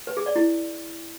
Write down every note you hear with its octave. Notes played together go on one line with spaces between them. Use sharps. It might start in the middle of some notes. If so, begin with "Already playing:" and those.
B4
G#4
D5
E4